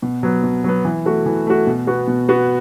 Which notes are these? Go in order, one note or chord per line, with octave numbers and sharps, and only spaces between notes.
B2
F#3 B3
B2
F#3 B3
E3
A3 F#4
E3
A3 F#4
B2
B3 F#4
B2
B3 F#4